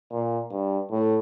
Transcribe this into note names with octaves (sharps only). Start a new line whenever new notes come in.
A#2
G2
A2